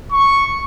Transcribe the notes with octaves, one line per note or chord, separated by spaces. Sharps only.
C#6